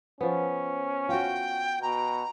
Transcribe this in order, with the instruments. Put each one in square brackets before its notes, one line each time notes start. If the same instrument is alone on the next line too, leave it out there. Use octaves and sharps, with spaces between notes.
[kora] F3 B3 [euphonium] C#4
[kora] F4 F#4 [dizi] G5
[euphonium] B2 [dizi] A#5